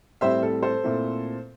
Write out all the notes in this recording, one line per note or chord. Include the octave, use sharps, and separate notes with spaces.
A2 G3 C4 C5 E5
A4
A4 C5
A#2 A3 C4 E4